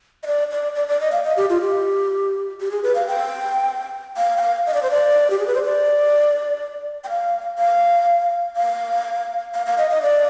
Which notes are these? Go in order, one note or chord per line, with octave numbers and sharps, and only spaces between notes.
D#5
D5
D5
D5
D5
D#5
F5
D#5
G4
F4
G4
G4
G#4
B4
F5
G5
F5
G5
F5
D#5
D5
C5
D5
G4
G#4
B4
C5
D5
G5
F5
F5
F5
F5
F5
D#5
D#5
D5